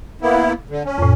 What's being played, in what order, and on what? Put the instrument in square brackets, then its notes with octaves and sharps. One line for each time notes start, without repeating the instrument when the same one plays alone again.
[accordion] A#3 B3 E4
D3
C#4
[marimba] F2 A2